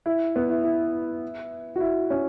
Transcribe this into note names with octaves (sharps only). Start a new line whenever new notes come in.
E4
B3
E4
E4
F#4
E4
C#4